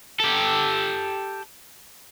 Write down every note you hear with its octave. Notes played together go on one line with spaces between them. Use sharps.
G4 A4